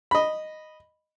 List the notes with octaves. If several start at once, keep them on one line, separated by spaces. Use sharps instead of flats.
D#5 B5